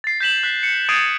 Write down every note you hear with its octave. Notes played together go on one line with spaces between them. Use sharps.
A6 C7
G6 B6 E7 F#7
F#6 B6
C#7
D#6 G#6 A6 C7 D7 D#7